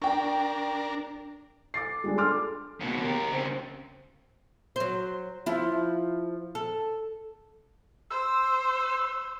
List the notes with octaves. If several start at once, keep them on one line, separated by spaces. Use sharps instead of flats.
D4 A#4 G5 C#6
D6 A6 C7
G3 G#3 D4
A4 C6 D6 F6
D#2 B2
G4 A#4
C#3 C4
F#3 C5
F3 E4
A4
C5 E6